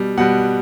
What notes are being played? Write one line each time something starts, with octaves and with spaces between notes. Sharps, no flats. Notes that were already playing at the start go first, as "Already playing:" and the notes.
Already playing: B2 G3
B2 G3 F#5